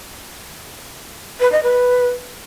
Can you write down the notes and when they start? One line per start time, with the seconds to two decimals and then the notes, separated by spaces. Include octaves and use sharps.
1.40 B4
1.52 D#5
1.63 B4